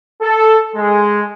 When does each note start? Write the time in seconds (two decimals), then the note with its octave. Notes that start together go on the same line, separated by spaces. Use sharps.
0.21 A4
0.76 G#3